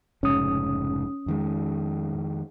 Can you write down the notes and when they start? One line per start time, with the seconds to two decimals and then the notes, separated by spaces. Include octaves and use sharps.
0.23 F1 G#2 C#3 C#4 D#6
1.26 F2 D#3 G#3